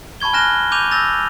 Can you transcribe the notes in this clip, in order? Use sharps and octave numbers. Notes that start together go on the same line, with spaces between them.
A5 B5 C#6 G#6 G7
G#5 F6 F#6 A#6 E7 G7
C#6 D6 G6 D#7 F7
E6 G6 A6 A#6 F7